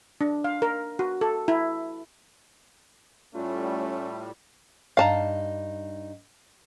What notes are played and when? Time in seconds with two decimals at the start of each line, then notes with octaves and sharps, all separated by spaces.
0.21 D4
0.44 F5
0.62 A#4
0.99 F#4
1.21 A4
1.48 E4
3.35 A2 G3 A3 C#4 F4
4.97 G2 D#4 F5 A5 A#5